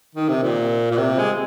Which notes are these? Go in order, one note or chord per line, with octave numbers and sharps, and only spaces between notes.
D#3
C3
A#2
A#2
C3
G#3